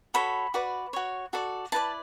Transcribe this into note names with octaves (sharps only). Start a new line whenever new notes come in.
F#4 A4 C#5 B5
F#4 B4 D5
F#4 C#5
F#4 A4 D5
E4 B4 D5 A5